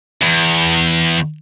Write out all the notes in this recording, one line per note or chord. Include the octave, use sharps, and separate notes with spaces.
E2